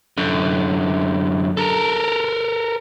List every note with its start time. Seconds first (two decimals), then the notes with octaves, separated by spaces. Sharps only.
0.18 F#2 D3
1.57 A4 A#4